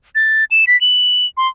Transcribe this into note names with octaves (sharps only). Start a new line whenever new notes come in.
A6
E7
B6
F#7
C6